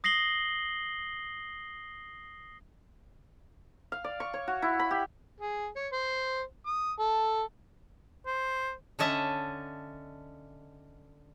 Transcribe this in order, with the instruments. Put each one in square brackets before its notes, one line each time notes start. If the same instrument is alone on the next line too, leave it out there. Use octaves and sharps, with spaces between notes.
[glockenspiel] D#6 A#6 C7 F#7 G7
[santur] F5
D5
C#6
C#5
F#4
E4
B5
G4
[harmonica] G#4
C#5
C5
D#6
A4
[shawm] C5
[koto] D3 C#4 D#5 E5 A5